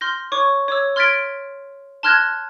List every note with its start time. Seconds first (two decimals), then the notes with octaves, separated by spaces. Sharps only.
0.01 C6 F6 G6 A#6
0.32 C#5 C#6 D6
0.68 C#5 D6 E6
0.96 C6 F6 G#6 A6 B6 D7
2.03 A5 C6 F6 F#6 G#6 A#6